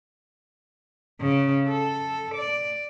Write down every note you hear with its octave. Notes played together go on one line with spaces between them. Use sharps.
C#3
A4
D5